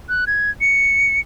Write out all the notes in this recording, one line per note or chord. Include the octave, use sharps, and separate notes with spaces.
F#6
G#6
C#7